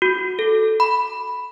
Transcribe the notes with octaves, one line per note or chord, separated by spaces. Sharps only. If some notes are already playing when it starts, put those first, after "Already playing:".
F#4
A4
B5